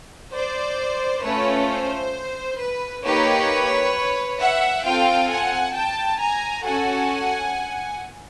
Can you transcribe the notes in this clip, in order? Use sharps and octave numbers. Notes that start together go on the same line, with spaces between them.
C5 D5
A3 C#4 F4 A4 B4 C#5
C5
B4
A#3 D#4 G4 B4 C#5
E5 F#5
C4 F4 A4 F5 G5
F#5 G#5
G5 A5
G#5 A#5
C#4 F#4 A4 F#5 G#5